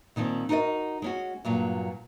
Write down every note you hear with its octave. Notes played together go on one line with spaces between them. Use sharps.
A#2 D#3 F3 C4
D#4 F#4 A#4 C#5 D#5
G#3 C#4 F#4
G2 A#2 F#3